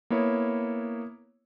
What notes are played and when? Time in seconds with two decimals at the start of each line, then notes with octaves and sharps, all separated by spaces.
0.10 A#3 B3 E4 C#5